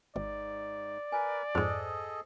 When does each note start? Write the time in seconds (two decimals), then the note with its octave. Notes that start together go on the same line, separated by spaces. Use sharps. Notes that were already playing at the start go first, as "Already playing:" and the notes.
0.16 G#1 G#2 D5
1.12 A#4 B4 G#5
1.55 F2 G#2 G#4 A4 C5 D#5